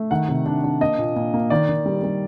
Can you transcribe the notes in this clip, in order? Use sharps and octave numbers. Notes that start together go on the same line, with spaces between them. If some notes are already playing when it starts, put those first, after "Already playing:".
Already playing: A3
D#3 F#5
C3
D4
D4
A#3 D#5
A#2
A#2
A#3
D#3 D5
D#3
G3
G3